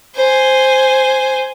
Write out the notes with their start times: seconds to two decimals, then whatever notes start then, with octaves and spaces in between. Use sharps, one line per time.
0.16 C5 G#5